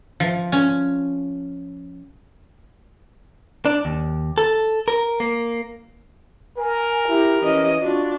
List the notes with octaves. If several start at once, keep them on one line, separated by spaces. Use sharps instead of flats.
F3
C#4
D4
D#2
A4
A#4
A#3
A#4 G#5
E4 G4
E3 C#4 D#5
D4 F4 F#4